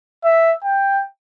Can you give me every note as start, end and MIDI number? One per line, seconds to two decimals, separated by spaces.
0.25 0.53 76
0.64 1.03 79